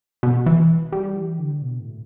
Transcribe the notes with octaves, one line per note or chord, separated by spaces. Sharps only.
B2
E3
G3
E3
D3
B2
A2